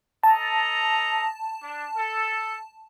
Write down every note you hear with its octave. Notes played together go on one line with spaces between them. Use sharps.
A4 D#5 A5 A#5
D4
A4